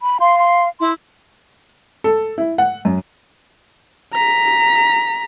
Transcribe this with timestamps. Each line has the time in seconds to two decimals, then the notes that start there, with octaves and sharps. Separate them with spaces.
0.02 B5
0.20 F5 C6
0.39 C6
0.80 E4 C6
2.04 A4
2.38 E4
2.58 F#5
2.85 F#2
4.14 A#5 B6